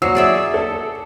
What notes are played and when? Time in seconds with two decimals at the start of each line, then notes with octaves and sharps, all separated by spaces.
0.02 F#3 E6 C7
0.15 G#4 D5 E5
0.54 A4